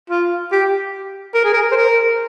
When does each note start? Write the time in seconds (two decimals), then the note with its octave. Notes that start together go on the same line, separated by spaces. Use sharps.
0.10 F4
0.52 G4
1.34 A#4
1.44 G#4
1.53 A#4
1.71 C5
1.76 A#4